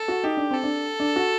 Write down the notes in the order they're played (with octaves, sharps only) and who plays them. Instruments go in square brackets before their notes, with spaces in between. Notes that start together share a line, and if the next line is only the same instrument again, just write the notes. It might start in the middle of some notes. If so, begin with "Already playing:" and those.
Already playing: [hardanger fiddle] A4
[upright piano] F#4
[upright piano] D#4 [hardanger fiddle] G4
[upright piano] D4
[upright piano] C4 [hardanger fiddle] A4
[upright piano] D4
D4
F#4